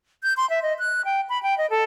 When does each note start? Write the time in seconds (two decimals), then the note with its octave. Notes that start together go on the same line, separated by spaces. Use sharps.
0.23 G6
0.37 C6
0.50 E5
0.63 D#5
0.79 F#6
1.05 G5
1.29 B5
1.43 G5
1.58 D#5
1.70 A4